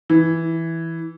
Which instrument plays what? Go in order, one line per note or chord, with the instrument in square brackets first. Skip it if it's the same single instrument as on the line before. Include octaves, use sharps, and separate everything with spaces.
[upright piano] E3